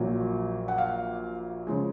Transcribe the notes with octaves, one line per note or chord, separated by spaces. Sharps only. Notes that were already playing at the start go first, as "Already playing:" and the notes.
Already playing: A#1 A#2 F#3
F#5
F5
C#3 F3 G#3